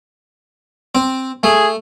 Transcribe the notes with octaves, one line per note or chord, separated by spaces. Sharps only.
C4
A3 G#4